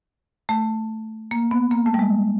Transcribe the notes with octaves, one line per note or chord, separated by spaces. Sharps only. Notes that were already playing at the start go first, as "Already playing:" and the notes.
A3
A#3
B3
A#3
A3
G3
G#3